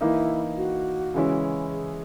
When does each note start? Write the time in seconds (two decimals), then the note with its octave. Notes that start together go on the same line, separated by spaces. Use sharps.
0.01 E3 A#3 D#4 E4
0.57 F#4
1.14 C#3 E3 G#3 C#4 E4
1.72 G#4